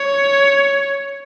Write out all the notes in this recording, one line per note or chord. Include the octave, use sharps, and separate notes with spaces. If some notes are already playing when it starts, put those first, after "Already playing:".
Already playing: C#5